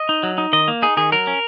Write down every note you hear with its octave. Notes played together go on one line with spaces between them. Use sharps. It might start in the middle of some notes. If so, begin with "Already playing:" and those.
Already playing: D#5
D#4
F#3
D#4
D#3 D#5
A#3
D#4 G#4
D#3 G#4
F#3 A#4
C#4